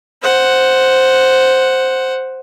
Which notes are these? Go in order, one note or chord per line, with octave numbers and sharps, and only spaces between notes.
C5 F#5